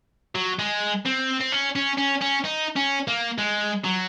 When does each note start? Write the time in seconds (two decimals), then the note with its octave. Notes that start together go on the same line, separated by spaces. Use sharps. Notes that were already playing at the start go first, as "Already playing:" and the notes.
0.35 F#3
0.59 G#3
1.06 C4
1.41 C4
1.52 C#4
1.76 C#4
1.98 C#4
2.22 C#4
2.45 D#4
2.76 C#4
3.08 A#3
3.38 G#3
3.84 F#3